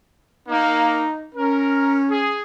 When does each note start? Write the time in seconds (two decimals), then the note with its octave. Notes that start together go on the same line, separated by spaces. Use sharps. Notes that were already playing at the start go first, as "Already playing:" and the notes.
0.48 A#3 D#4
1.34 C#4 A#4
2.09 G#4